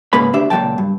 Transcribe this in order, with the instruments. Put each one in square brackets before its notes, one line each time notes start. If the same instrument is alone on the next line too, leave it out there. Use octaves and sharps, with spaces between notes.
[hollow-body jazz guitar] G#2 C#3 G#3 A#3 B4 B5
D2 D4 G4 E5
C#2 A#2 D#3 F#3 G5 A5
G2